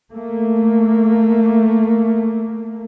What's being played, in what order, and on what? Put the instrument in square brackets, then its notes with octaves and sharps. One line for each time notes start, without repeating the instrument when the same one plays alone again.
[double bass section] A3 A#3